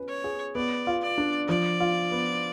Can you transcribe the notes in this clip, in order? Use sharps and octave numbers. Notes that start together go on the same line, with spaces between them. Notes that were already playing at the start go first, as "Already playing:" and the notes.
Already playing: C#4 B4
C#5
G#4
B3 D5
F4
D5
D4
F3 D5
F4
B3